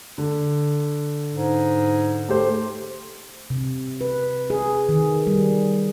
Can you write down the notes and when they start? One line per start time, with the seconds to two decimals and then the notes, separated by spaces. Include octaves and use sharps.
0.18 D3
1.34 G#2
2.28 A3 G4 C5
3.50 C3
4.01 B4
4.50 G#4
4.89 D#3
5.27 G3